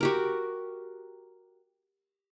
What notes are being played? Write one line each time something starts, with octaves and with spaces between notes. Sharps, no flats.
F#4 G4 A#4